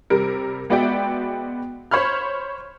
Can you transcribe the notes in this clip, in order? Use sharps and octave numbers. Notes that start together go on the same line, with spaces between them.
C3 G3 A#4
G#3 B3 F#4 D5 E5 G5
C5 C#5 B5 F6